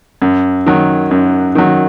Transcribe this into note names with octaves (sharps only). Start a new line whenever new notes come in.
F#2
D#3 F#3
F#2
D#3 F#3